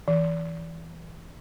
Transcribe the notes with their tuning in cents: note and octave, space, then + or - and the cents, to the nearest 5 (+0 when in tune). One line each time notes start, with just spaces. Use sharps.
E3 -5